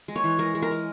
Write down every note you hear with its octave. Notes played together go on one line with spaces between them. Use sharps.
G#3
C#5
E3
G#3 A#4
G#3
A#4
G#3